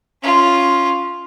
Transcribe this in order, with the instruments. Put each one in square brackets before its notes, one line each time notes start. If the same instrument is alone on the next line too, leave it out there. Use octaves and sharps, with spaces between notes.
[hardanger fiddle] C#4 F4